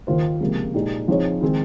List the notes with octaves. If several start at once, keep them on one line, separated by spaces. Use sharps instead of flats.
D#2 D#3 A#3 F4 C5
C#2 C3 F3 A#3
A#2 G#3 D#4 G4
F3 C4 D#4 G#4 C#5
D#3 G#3 C4